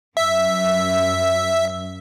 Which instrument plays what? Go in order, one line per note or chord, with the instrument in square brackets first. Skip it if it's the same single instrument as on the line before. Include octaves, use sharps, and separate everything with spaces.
[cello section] F#2 [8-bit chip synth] E5